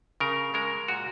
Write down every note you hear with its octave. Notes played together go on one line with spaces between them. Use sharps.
C#3 A#4
G#3 A#4
A#2 F#4